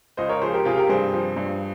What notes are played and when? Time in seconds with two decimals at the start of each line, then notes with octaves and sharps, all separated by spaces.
0.17 C#2 C5 D#5
0.29 A#4 C#5
0.42 F3 G#4 C5
0.53 G4 A#4
0.65 C3 F4 G#4
0.77 G4 A#4
0.89 G2 G#4 C5
1.13 F3
1.36 G2